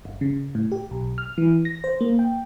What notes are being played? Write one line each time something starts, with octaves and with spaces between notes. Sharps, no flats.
G1
C#3
A2
G4
B1
F6
E3
A#6
C5
A#3
G5